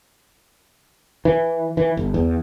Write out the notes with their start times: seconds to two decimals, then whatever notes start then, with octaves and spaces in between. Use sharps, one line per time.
1.25 E3
1.77 E3
1.97 G1
2.14 E2